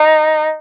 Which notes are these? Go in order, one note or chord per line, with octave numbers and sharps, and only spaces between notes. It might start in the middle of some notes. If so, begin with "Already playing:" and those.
Already playing: D#4